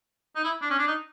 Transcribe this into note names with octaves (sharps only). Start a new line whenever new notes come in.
D#4
E4
D4
C#4
D4
D#4